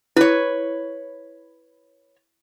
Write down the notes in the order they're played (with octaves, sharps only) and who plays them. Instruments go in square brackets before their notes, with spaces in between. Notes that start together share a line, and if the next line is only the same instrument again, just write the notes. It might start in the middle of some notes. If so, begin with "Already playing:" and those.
[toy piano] E4 [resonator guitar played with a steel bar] B4 C#5